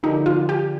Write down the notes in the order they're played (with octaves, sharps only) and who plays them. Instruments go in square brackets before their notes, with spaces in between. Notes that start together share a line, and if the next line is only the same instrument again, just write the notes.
[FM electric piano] D3 F3 A#3 D4 G4 [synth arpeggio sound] D#4
[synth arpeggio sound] F4
G4